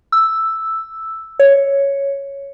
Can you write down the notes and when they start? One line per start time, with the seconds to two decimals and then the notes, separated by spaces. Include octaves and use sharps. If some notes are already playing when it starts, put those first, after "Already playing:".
0.12 E6
1.39 C#5